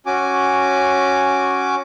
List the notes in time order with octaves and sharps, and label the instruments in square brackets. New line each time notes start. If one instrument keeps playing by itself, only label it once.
[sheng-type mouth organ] C#4 F#4 G#5 D6